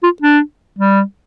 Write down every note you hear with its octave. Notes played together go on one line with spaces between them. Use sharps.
F4
D4
G3